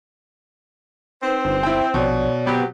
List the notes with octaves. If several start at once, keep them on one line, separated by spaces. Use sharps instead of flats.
C4 D#4 B4 C5
G1
E4 G5 C6 E6
A#1 B2 C#5 D5
F#3 B3 C4 G4